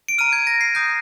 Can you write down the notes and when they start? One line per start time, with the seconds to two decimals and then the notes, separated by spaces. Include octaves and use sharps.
0.08 D7
0.18 A#5 F6 D#7
0.33 G#6
0.47 A#6
0.61 C7
0.75 A#5 D#6 G6 C7